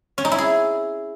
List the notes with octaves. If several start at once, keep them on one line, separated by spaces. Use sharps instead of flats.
C#4
D#4
E4
G#4